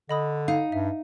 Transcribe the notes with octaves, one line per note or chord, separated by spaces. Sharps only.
D3 D#5 B5 D#6
D#4 F5
G2 E5